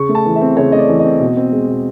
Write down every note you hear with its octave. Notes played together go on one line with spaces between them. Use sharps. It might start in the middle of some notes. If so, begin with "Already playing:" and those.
Already playing: C#3 C#6
A3
A5
E3
E5
C4
C#3 C#5
A3 D#5
D5
E3
C4 D#5
B2
C4
G#3
B2